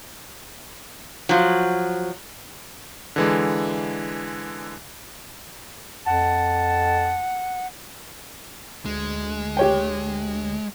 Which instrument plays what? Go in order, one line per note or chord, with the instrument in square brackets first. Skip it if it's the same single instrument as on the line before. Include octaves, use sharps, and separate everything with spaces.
[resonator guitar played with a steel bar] F3 F#3
[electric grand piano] D3 E3 G#3
[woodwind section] F2 A5 [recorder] F#5
[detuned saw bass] D2 [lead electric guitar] G#3
[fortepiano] G4 C#5 G5